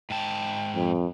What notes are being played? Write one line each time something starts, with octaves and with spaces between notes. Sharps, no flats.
G#2 G5 A5
F2